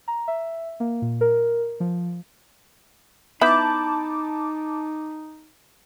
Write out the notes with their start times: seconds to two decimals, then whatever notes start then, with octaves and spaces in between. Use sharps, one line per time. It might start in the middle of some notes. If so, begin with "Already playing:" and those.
0.08 A#5
0.28 E5
0.80 A#3
1.02 A#2
1.21 A#4
1.80 F3
3.41 B3 D#4 E4 E5 A5 B5 D6 G6